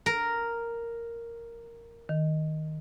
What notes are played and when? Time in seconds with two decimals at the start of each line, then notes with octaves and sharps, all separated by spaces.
0.06 A#4
2.09 D#3